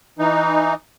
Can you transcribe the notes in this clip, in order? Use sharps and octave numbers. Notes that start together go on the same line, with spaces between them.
E3 D#4